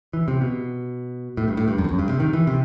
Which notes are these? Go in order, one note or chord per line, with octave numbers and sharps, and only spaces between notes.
E3
C3
B2
A2
G2
A2
G2
F#2
E2
F#2
G2
C3
D#3
E3
C3